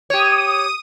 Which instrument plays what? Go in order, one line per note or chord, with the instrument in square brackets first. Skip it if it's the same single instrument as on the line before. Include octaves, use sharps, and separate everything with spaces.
[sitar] G4 C#5 [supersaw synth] D#6 D#7